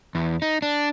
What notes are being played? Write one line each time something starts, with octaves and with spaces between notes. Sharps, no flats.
E2
D#4
D4